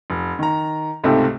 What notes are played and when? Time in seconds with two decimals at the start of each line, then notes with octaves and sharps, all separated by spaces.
0.10 F1
0.39 D#3 A#5
1.04 C#2 G#2 C3 A3 C4 A4